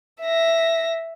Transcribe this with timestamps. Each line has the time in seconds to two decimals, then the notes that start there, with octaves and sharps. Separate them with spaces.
0.22 E5 A#6